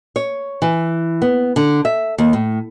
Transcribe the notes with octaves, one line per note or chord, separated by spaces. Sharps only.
C#5
E3
B3
D3
E5
D#2
A2